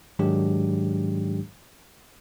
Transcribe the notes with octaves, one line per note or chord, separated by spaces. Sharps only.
G#2 D#3 F#3 G#3 D4 G4